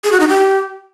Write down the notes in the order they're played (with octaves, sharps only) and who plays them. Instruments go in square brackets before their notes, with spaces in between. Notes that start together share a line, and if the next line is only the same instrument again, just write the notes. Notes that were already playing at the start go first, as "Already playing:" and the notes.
[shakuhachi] G#4
F#4
D#4
G4